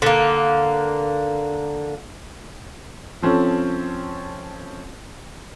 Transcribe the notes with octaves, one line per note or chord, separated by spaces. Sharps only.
D3 A#3
F3 C4 C#4 A4